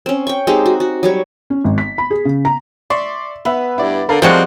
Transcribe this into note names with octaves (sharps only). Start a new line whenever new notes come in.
C4 C#4
G5 C#6
G#3 C4 D#4 G4
F#4
F#4
F#3 G3 C#5
C#4
G#1
B6
B5
G#4
C#3
A#5
D5 E5 C6 C#6
B3 B4 E5
G2 E4 D5
D3 A4 A#4 F5
F3 G3 G#3 C4 F#4 C#5 F#5